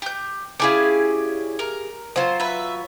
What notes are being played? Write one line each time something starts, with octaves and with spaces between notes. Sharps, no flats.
G4 G6
C#4 E4 G4 G#4 D5 F5
A#4
F#3 F4 C5
B4 E5